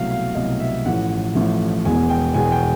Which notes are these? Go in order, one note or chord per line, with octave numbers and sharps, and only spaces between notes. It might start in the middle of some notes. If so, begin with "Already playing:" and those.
Already playing: C2 B2 F#3 A3 F5
F5
C2 B2 F#3 A3 D#5
E5
A1 A2 F3 A3 F#5
A1 A2 F3 A3
E1 E2 B2 G#3 G#5
G5
E1 E2 B2 G#3 G#5
G5